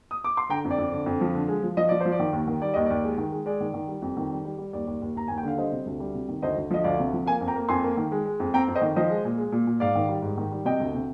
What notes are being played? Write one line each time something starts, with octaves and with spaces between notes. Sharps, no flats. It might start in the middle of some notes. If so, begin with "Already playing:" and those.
D#6
D6
C6
D3 G5 A#5
F2
D5
F2
D3
F2
F3
D3
G#3
F3
F3 D#5
F3 D5
F3 C5
D5
D#3
D#2
D#3
G3 D5
D#2 D#5
D#2 D5
G#3
D#3
G#3
G#3 D5
D#3
D#3
G3
F2
D#3
G3
G3
G3
D#2 D5
D#2
D#2
D#2 A#5
D#2 G#5
G5
D3 F5
G3 C5 D#5
C3
D2
G3
C3
D#3
D2 C5 D#5
D2
F3 D#5
D2 D5 F5
C3
F3
A#3 F5 G#5
F2
G5 A#5
A#3
F2 G#5 C6
A#3
D#3
G#3
G#3
F2
C4 G5 A#5
F2
C5 D#5
D#3
F3 C5 D#5
G#3
A#2
G#3
A#2
A#2
G#2 D5 F5
D#3
G3
G#2
D#3
G3
C3 D#5 G5
D2
C3